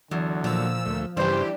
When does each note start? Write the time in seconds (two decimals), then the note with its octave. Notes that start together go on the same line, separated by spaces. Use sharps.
0.11 E2 D3 F#3
0.44 A#2 F3 E6
0.86 D2 A3
1.17 G2 C#3 E3 G3 D4 G4 C5